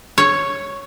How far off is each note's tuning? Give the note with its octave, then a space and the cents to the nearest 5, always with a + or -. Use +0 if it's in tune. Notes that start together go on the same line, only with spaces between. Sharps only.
C#5 +0